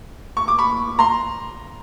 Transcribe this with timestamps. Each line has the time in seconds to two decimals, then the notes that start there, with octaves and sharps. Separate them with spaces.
0.37 C#6
0.48 D6
0.59 B5 C#6
0.99 A#5 C6